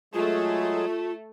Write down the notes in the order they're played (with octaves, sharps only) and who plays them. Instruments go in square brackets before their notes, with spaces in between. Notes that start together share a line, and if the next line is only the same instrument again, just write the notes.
[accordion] F#3 G#3 G#4 [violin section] A3 [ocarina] F4